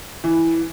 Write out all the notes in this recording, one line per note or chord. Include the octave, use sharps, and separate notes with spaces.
E3